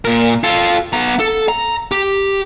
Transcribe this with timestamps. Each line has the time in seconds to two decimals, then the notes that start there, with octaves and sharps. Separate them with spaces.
0.05 A#2 A#4
0.43 F4 A4
0.93 B3 A#5
1.19 A4
1.49 A#5
1.92 G4